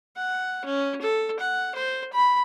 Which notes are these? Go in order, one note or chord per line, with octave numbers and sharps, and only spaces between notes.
F#5
C#4
A4
F#5
C5
B5